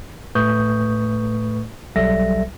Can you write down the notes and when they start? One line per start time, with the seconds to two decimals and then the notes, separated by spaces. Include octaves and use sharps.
0.35 A2 A3 B4 C#6 D#6 G6
1.96 B1 F#3 G3 A4 E5 A#6